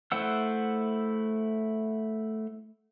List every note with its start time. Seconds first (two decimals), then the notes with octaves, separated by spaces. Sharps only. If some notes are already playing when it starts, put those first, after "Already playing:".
0.12 A3 E4 C5 F#5 E6